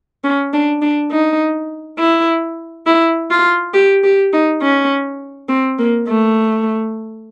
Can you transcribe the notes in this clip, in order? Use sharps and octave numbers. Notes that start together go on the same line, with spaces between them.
C#4
D4
D4
D#4
E4
E4
F4
G4
G4
D#4
C#4
C4
A#3
A3